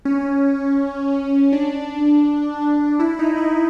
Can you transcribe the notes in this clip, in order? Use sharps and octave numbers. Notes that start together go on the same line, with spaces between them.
C#4
D4
E4
D#4
E4